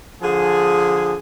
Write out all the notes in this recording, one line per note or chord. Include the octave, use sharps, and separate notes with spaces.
D3 F3 G#4